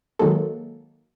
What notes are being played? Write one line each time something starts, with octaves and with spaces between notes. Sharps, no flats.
D#3 F#3 G#3 A#3 A4